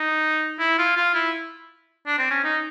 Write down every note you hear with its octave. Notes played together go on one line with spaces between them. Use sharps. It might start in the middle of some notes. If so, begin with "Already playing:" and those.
Already playing: D#4
E4
F4
F4
E4
D4
C4
C#4
D#4